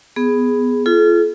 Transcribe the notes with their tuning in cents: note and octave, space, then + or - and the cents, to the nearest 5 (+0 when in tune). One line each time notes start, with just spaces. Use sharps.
B3 +5 G#4 +0
F4 -25 A4 -45